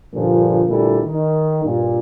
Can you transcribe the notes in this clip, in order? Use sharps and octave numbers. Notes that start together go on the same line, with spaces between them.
G2 A#2 D3 F3
D2 A#2 G3 E4 A4
D#3
G2 A#2